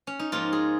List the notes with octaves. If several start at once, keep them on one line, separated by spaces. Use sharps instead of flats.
C#4
D#4
G#2 F3 A#3 C#4 F4
G#4